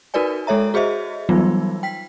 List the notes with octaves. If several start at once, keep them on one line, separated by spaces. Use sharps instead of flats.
D#4 F#4 A#4 B4 D5 G#5
G#3 A4 C#5 E5 A#5
F#4 G#4 C5 D#5 E5
E3 F#3 G3 B3 D#4 F4
G5 B6